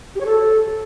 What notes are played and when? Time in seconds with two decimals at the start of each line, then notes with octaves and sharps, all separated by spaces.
0.15 G4
0.20 C#5
0.26 A4